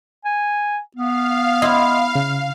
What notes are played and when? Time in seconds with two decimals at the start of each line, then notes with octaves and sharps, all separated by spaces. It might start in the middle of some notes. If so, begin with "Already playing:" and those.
0.25 G#5
0.96 B3 F5
1.62 E4 D#5 C6
2.15 C#3